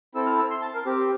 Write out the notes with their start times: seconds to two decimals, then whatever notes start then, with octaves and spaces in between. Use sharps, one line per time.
0.15 C4 E4 A4 E6
0.26 F6
0.39 E6
0.50 C6
0.62 A5
0.74 A#4
0.85 C4 G4